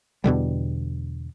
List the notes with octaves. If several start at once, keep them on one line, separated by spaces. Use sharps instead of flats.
E2 B2 D3 G3